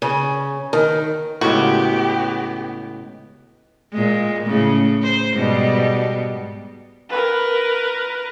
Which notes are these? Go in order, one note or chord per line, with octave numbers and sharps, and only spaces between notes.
C#3
D#3
C#2 A2 B3 F#4 G4
A#2 G#3
A2 C#3
C5
G#2 B2 G3
A#4 B4